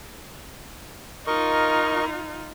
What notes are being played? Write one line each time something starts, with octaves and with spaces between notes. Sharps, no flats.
D#4 F4 A#4 D#5 C#6